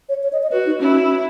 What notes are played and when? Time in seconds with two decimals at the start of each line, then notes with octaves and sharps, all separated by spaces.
0.09 C#5
0.23 C#5
0.33 D#5
0.43 D#5
0.51 F#4 B4
0.66 D#4
0.80 C#4 E4